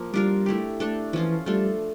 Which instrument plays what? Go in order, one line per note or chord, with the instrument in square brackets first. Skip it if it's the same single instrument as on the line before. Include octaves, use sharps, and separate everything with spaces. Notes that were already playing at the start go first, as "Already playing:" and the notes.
Already playing: [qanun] F3 A#3
[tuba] G3 [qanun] D4 F4 A#4
[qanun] A3 E4 G4
A3 D4 A4
[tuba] E3 [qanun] F3 C#4 F4
[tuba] G3 [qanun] A3 D4 F4 A4